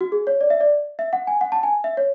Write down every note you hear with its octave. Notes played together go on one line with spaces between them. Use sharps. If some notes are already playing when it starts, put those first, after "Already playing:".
F#4
G#4
C#5
D5
E5
D5
E5
F#5
G#5
F#5
A5
G#5
E5
C#5